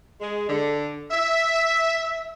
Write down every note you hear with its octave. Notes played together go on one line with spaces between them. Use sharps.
G#3
D3
E5